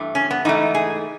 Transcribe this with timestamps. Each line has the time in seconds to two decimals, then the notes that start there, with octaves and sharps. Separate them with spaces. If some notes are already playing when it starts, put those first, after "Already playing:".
Already playing: G2 E3 A3
0.15 C#4
0.31 B3
0.45 G#2 E3 A3 D#4
0.74 G#4